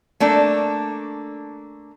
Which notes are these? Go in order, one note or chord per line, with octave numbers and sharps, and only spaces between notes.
A3 A#3 D4